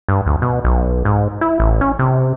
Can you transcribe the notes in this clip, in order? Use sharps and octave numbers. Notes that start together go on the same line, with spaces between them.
G2
D2
B2
B1
G#2
E4
A1
C#4
C3